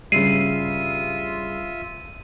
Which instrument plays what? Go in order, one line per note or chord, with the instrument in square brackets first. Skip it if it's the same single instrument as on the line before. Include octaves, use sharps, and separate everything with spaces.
[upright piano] G2 C#3 [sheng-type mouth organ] F4 E5 [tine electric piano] C7 [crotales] D#7